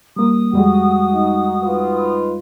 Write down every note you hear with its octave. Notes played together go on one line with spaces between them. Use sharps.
G3 A#3 D#6
F2 G3 G#3 F#4
D#4
D#4 F4 B4